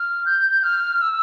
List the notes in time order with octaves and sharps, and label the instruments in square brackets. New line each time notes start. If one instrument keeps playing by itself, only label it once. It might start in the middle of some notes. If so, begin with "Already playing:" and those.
Already playing: [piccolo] F6
G6
F6
E6